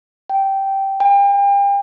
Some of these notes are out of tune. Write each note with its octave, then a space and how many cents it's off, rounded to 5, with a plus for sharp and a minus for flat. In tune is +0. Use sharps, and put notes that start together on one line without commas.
G5 -10
G5 +35